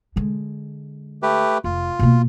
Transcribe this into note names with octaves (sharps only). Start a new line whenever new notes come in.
D3 G#3
A3 G4 B4
F1 F4
B2 A#3